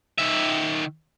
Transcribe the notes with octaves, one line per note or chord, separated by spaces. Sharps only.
D#3 E5